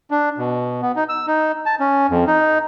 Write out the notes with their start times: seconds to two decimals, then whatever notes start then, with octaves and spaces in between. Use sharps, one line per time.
0.11 D4
0.38 B2
0.82 B3
0.96 D#4
1.09 E6
1.27 D#4
1.66 A5
1.80 C#4
2.10 F2
2.27 D#4